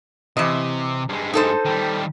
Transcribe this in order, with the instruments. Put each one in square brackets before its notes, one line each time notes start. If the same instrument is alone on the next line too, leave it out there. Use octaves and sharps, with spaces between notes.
[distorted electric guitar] C3 [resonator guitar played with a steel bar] E3 D#5
[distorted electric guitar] G2 G#3
[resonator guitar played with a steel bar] D#4 A4 C5
[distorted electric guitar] D#3 G3